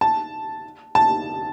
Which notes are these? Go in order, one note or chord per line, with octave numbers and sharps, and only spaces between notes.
A5
A5